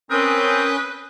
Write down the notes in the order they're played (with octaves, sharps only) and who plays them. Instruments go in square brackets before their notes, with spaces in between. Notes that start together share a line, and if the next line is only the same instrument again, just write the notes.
[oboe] C4 [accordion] C#4 D#6 G6 [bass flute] A#4 [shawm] B4